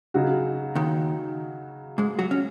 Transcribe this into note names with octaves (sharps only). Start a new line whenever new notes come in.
C#3 F#3 D#4 F#4
D#2 D#3
G#2 G#3
F#3 F#4
C#4